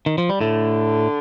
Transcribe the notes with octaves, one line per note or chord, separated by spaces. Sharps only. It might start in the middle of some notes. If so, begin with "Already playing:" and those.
D#3
F3
G3
A2 D3 A3